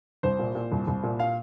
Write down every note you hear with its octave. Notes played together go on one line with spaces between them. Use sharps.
C2 C5
A#2
A#2
C2
C2
A#2
F5